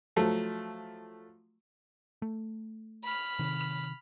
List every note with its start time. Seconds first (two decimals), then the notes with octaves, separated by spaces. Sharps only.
0.16 F3 F#3 A3
2.22 A3
3.04 B5 F6
3.39 C3 D#3